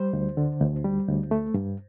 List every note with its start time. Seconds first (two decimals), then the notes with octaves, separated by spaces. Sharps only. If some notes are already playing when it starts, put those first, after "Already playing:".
Already playing: G3 C5
0.13 D2
0.37 D3
0.60 D2
0.84 G3
1.08 D2
1.31 A3
1.54 G2